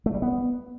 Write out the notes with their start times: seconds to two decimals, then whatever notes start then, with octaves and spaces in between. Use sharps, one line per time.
0.06 A3
0.14 G3
0.22 B3